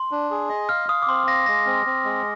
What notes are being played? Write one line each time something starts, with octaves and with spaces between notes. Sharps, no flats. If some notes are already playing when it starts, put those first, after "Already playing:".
Already playing: C6
D4
G#4
D#5
F5 F6
F5 D#6
D6
C4 C6
F5 A#6
G#3 A#6
C4
C4
G#3